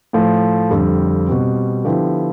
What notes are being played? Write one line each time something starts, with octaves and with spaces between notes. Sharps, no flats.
A2 F3 A3
F2 D3 G3
B2 G3 C4
D3 F3 B3 E4 G4